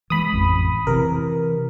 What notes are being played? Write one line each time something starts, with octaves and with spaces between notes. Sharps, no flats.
E3 G#3 B5 D#6
A1 F2
C3 E3 A#4